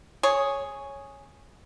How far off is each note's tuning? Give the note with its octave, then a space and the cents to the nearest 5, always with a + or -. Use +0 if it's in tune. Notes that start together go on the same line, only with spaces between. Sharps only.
G#4 +0 C#5 +0